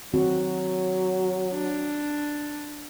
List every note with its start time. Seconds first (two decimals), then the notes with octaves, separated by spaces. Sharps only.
0.14 D#3 F#3 C4 F#4
1.53 D4